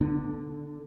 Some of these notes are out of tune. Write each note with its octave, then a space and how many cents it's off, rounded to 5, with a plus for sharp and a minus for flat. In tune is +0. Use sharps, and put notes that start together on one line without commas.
D3 +0 B3 +10 D4 +35